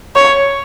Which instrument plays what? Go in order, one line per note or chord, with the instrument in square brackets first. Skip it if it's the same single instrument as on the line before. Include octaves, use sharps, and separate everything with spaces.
[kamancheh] C#5